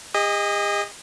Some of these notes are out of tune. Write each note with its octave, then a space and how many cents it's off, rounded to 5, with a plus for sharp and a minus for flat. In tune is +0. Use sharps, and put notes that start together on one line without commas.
G#4 -45 D#5 +0